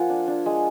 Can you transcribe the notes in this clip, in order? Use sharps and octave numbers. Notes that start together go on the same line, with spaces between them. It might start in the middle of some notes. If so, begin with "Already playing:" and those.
Already playing: F3 A#3 F4 F#5 G#5 A#5
D4
D4
G#3